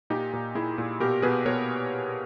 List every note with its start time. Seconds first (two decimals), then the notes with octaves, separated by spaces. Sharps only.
0.10 A#2 D#4 G4
0.33 A#2
0.55 A#2 E4 G#4
0.78 A#2
1.00 B2 G4 A#4
1.22 B2 G#4 B4
1.46 B2 A#4 C#5